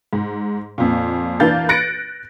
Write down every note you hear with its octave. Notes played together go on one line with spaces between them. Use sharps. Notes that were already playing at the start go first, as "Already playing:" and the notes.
G#2
F2 A#2
E3 A#3 D4 F5 G6 A6
F#6 A6 A#6 C#7 D7